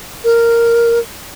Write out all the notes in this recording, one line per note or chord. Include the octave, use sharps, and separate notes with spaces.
A#4